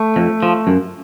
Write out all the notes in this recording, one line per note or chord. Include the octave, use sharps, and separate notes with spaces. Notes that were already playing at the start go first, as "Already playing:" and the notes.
Already playing: A3
F2
F3
F#2